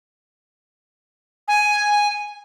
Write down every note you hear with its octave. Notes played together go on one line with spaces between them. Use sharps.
G#5